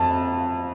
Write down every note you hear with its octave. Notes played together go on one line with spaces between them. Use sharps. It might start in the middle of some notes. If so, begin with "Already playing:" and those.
Already playing: F2 A5